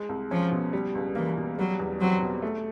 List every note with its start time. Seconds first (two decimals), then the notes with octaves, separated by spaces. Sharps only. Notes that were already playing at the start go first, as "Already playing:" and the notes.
Already playing: G#3
0.09 C2
0.31 F3 C#4
0.51 B2
0.73 G3
0.95 C#2
1.15 E3 A#3
1.37 B2
1.59 F#3 G3
1.79 E2
2.00 F#3 C4
2.22 B2
2.42 A3